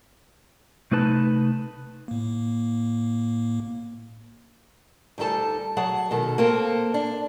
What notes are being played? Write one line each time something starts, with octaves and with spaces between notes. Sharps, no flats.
C3 A3 D#4 B4 A5
A2 A#3
D2 G3 D#4 A4 A5
F#3 G#4 F#5 A5
B2 D#3 A4
A#3 C4 A4
D4